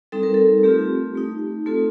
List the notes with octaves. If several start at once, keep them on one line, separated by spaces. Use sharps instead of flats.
G3 C4 D#4 A4
A#4
A4
A3 C4 F4 G4
A3 D#4
A3 C4 F4 A4